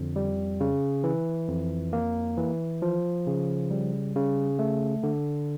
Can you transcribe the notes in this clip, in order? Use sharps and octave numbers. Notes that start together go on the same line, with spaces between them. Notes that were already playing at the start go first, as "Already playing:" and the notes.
Already playing: F2 D3
G3
C#3
E3
F2
A#3
E3
F3
C#3
G3
C#3
A3
D3